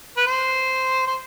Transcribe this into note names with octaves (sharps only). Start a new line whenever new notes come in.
B4
C5
C5